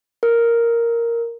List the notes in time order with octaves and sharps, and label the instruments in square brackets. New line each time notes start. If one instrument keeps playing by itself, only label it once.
[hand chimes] A#4